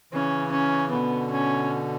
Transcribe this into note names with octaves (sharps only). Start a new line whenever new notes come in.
C#3 E3 C#4
C#4
B2 D3 B3
C#4